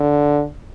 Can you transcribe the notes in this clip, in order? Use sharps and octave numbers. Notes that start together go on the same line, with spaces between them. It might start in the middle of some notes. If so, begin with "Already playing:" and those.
Already playing: D3